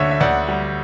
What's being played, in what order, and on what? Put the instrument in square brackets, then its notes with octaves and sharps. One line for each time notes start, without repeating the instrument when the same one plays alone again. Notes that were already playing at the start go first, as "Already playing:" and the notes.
Already playing: [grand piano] D2 D3 C#5 E5
E5
D2 D5 F#5
G3